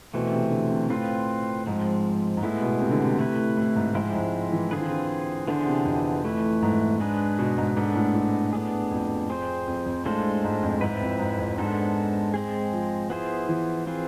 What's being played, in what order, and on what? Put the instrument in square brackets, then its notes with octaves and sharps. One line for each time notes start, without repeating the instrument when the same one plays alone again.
[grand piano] B2 [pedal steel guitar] E3 A3 C4
[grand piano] C3
D3
C3
[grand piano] A2 [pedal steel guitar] C4 F4 B4
[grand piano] G#2 [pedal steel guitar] F3 G#3 C4
[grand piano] G#2
[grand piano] A2 [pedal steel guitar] G#3 B3 E4
[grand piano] B2
C3
D3
C3
[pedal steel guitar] A3 E4 B4
[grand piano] A2
G#2
[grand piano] G#2 [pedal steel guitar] F3 G#3 C4 E4
[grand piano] G#2
E3
[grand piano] D3 [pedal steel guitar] C4 F4 G#4 B4
[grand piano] E3
D3
[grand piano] D3 [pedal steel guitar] E3 B3 D4 G#4 C5
[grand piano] C3
F2
[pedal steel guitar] E3 A3 E4 B4
[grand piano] G#2
[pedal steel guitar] G#3 D4 G#4 B4
[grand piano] B2
G#2
[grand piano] G#2 [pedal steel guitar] G#3 B3 D4 A4
[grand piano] A2
A2
[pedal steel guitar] B3 D4 G#4
[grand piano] F2
[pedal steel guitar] C4 G#4 C5
[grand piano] F2
F2
[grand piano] A2 [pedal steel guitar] G#3 D4 F4 A4 C5
[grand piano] G#2
F2
[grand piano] G#2 [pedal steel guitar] C4 E4 B4
[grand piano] F2
G#2
F2
[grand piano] G#2 [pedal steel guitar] G#3 B3 D4 A4 C5
[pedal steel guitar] G#3 C4 G#4
[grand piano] F3
[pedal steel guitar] B3 E4 G#4 C5
[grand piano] E3
[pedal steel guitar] C4 F4 G#4 B4